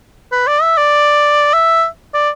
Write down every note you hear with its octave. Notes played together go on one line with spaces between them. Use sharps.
B4
D5
E5
D5
E5
D5